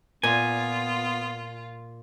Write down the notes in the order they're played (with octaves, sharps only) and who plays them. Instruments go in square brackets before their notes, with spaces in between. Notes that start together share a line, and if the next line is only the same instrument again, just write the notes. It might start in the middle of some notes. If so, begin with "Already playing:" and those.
[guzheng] A#2 [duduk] B3 [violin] F4 [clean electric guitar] G#5